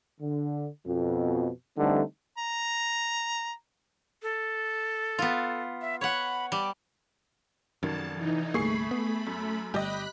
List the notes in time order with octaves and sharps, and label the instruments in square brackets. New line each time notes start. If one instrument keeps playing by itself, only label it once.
[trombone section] D3
F2 B2
D3 E3 G3 A3 C4 D#4
[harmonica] A#5
[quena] A4
[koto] B3 F4
[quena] E5
[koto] C#5 F#5 [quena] B5
[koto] G3 [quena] D6
[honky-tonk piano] F1 [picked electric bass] F#2 D#3 [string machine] A5
[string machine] E3 D#4
[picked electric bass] G1 C2 A#3 [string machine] A3 B5 [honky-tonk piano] G#4 C#6 C7
[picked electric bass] B3
[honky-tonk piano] F#2
[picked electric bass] G1 G3 [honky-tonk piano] G4 D#5 [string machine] B5 F#6 B6